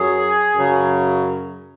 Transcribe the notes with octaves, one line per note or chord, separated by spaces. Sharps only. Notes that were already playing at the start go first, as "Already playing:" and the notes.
Already playing: F#2 F#3 G#4
F#2 C#3 F#3